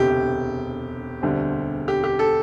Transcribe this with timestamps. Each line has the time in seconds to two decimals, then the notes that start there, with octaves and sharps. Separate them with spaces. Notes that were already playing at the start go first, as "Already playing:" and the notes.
Already playing: E1 D2 C3 G4
1.22 E1 D2 D3 G3 C4
1.88 G4
2.04 G4
2.19 A4